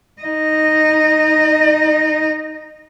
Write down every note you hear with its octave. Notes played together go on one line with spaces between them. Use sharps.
D#4 D#5